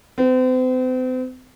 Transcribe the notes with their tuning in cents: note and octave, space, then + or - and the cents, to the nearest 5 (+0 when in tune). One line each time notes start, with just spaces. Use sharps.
C4 -40